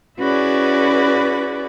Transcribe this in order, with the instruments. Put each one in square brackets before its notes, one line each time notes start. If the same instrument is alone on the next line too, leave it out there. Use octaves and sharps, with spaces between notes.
[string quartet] C#4 E4 F#4 G#4 B4 D5